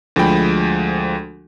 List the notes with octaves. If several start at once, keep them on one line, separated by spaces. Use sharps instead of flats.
D2 F3 G#3 G5 B5